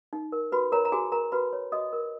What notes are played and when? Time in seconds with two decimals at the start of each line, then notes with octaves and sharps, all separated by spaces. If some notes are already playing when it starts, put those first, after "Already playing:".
0.13 D#4
0.32 A#4
0.52 F#4 B4 B5
0.72 A#4 C#5 A#5
0.85 A#5
0.92 F#4 G#4 G#5
1.12 A#4 A#5
1.32 F#4 B4 B5
1.53 C#5
1.72 F#4 D#5 D#6
1.93 A#4